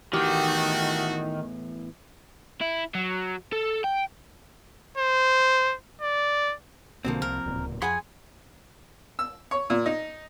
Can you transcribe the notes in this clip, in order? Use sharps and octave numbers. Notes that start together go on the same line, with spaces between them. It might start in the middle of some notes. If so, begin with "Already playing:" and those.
E2 A2 D#3 E3 A3 F#4 G4 G5
E4
F#3
A4
G5
C5
D5
B1 B2 D3 F3 A#3 C4
C2 A#4
D1 C#2 A#2
F2 G#4 F#5 G#5 B5 C6
E6
C#5
A#2
D#4